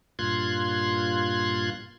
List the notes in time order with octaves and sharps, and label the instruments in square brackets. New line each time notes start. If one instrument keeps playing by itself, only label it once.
[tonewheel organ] G2 A#2 F4 C6 F#6 G#6